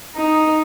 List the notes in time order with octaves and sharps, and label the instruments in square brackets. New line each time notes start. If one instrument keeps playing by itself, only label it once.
[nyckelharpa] D#4